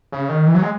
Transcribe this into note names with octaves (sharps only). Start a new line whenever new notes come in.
C#3
D#3
E3
F#3
G#3